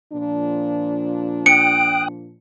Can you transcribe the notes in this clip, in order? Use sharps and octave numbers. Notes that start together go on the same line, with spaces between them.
A#2 F3 D4
G5 D#6 F#6 C#7 D7